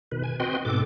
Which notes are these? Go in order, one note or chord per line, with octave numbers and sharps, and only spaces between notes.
B2 D#3 B4
G#5
C4 F#4 B4 D#5 G5 C6
G#2 B2 A4 D6